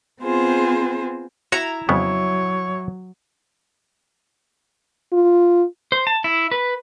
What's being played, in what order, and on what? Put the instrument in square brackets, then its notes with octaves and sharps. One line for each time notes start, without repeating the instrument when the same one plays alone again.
[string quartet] B3 C4 F4 G#4 C5
[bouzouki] E4 A#5 [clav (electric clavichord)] F#4
[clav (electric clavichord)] F2 C#3 B3 [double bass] F#3 [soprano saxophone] C#5
[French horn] F4
[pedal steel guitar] C5
A5
E4
B4